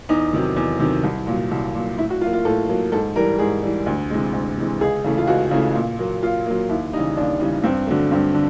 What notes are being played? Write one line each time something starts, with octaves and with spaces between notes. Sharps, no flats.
E2 D#4
C3 D#3 F#3
E2
C3 D#3 F#3
C2
A#2 F#3
C2
A#2 F#3
A2 E4
F#4
F#3 A#3 F4
F4
A2 A4
F#3 A#3
G#2 A4
E3 G3 A#4
G#2 G#4
E3 G3
D2
C3 E3 G#3
D2
C3 E3 G#3
C#2 G#4
C#3 E3 A3
F4
C#2 F#4
C#3 E3 A3
A#2
F#3 A#3
A#2 F4
F#3 A#3
D#2 E4
C#3 E3 G3 D#4
D#2 D4
C#3 E3 G3
G2 C4
D3 F#3 A3
G2 C4
D3